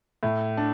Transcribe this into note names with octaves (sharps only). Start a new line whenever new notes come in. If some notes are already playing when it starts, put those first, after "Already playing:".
A2
D4